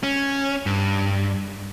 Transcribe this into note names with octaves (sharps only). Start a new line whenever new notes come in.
C#4
G2